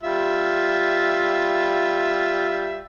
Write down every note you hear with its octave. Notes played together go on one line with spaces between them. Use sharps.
G3 F4 E5